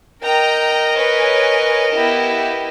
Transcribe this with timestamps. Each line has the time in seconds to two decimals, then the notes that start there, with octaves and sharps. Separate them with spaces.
0.22 A#4 D#5 G5 A#5
0.97 B4 C#5 G#5
1.92 B3 E4 G4